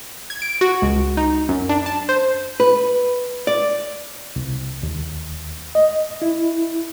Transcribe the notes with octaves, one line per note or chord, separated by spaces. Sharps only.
G#6
D7
F#4
C#2
D#4
F#2
D4
A5
C5
B4
D5
C2
D#2
D#5
E4